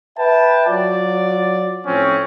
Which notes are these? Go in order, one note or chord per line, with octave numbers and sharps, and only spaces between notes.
B4 E5 G5 A5
F#3 F4 D5
A2 F3 C4 C#4